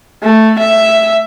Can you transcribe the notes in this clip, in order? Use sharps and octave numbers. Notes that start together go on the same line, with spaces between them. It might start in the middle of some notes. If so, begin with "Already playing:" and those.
A3
E5